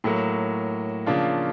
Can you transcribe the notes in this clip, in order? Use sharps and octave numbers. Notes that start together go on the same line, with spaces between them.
A2 F#3 A#3
C#3 F3 A#3 D4 F4